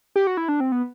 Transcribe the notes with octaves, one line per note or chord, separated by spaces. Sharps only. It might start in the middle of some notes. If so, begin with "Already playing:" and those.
G4
F#4
E4
D4
C4
B3